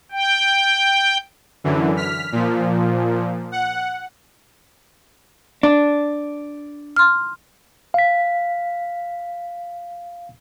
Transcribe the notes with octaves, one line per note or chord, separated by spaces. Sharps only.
G5
F#2 D3 E3
F6 B6
A#2 F3
F#5
D4
C6 F6
F5 B6